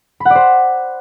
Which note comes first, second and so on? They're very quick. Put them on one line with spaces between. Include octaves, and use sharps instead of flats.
B5 F#5 D5 C5